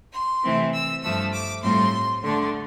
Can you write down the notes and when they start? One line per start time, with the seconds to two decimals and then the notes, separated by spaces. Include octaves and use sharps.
0.13 C6
0.43 C3 E3 A3 C4 E4
0.73 E6
1.02 G2 F3 A3 E6
1.33 D6
1.63 A2 G3 C4 F4 C6
2.23 D3 A3 D4 C6